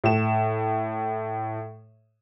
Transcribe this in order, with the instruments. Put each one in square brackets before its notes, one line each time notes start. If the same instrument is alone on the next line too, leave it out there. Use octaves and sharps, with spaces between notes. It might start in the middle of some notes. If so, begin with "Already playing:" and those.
[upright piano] A2 E7